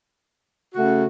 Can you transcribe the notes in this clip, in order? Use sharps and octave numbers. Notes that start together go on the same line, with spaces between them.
C#3 A3 F#4